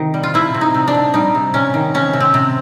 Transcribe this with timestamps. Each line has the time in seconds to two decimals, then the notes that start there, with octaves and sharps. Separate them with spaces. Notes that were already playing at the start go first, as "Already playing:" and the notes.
Already playing: C3 D#3
0.14 G3
0.23 F4
0.34 C3 E4
0.55 C3
0.61 D#4
0.74 C3
0.88 D4
0.95 C3
1.14 G3 D#4
1.35 C3
1.54 C3 C#4
1.74 D#3
1.94 C3 C#4
2.13 C3
2.20 C4
2.34 C3